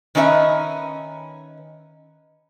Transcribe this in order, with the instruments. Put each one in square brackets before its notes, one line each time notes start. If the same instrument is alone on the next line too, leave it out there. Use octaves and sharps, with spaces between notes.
[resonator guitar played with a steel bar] D#3 C#4 D#4 B4 E5